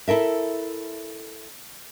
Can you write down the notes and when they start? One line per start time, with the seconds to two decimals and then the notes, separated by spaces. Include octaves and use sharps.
0.08 E4 A4 A#4 E5